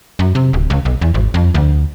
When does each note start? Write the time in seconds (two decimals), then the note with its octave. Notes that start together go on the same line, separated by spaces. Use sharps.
0.19 F#2
0.35 C3
0.53 D1
0.70 C#2
0.85 B1
1.01 E2
1.14 G#1
1.34 F2
1.54 D2